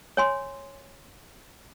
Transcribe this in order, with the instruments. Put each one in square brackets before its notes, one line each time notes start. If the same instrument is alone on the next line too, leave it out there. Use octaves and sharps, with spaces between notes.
[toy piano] C#5 G#5 C6